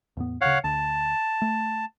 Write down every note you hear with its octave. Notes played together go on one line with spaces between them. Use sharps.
E2 A2 B3
D1 C#3 C#5 F5 F#5
D2 A5
A3